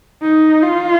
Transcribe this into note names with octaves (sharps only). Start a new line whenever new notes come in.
D#4
F4